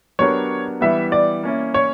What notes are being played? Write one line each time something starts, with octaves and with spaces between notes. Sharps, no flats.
F#3 B3 D4 G4 A#4 C#5
E3 G3 B3 E5
D5
A#3 C#4 E4
C#5